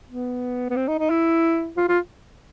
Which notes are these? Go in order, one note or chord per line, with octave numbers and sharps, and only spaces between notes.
B3
B3
C4
D#4
D#4
E4
F4
F4